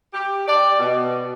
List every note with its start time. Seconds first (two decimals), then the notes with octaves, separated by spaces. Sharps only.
0.14 G4
0.47 D5
0.79 B2